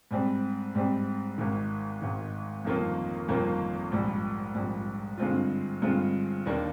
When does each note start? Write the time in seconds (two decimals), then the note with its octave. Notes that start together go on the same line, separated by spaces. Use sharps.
0.11 G#2 G3 C4 G4
0.75 G#2 G3 C4 G4
1.38 G#1 G#2 D#3
2.01 G#1 G#2 D#3
2.65 G1 F2 D#3 A#3 F4
3.28 G1 F2 D#3 A#3 F4
3.92 A#1 G#2 G3
4.55 A#1 G#2 G3
5.18 G2 D3 G#3 C4 F4
5.82 G2 D3 G#3 C4 F4
6.46 D#2 D#3 A#3 D4